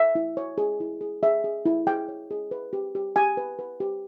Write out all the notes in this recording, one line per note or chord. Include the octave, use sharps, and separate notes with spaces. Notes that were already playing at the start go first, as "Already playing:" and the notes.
Already playing: E5
E4
C#5
G#4
E4
G#4
G#4 E5
G#4
E4
G#4 G5
C#5
G#4
B4
G4
G4
G4 G#5
B4
B4
G4